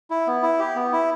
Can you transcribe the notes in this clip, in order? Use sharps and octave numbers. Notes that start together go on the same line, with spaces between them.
E4
B3
E4
G4
B3
E4